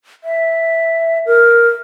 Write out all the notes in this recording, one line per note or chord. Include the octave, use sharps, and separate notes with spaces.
E5
A#4